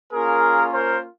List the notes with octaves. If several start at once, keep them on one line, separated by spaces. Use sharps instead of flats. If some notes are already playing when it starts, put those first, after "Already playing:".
A#3 C#4 F4 G#4 A#4
A#4 C5